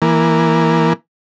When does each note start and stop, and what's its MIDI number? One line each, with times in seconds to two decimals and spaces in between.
0.02 0.93 52
0.02 0.93 58